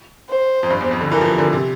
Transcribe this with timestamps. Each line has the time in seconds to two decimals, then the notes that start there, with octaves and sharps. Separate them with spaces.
0.29 C5
0.63 F2
0.71 G2
0.81 E2
0.91 F2
1.01 D3
1.12 E3 A#4
1.21 F3
1.25 E3
1.38 D3
1.53 C3